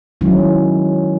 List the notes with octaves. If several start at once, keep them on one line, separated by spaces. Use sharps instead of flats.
D#3 F#3 G#3 C#4 E4